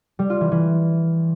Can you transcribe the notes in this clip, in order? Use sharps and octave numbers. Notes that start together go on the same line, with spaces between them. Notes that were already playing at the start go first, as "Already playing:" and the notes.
G3
F4
E3
E3